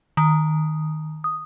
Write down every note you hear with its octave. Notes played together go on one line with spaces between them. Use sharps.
D#3
D#6